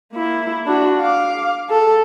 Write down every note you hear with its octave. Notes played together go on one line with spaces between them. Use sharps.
A#3 E4
D4 F#4
F5 D6
A4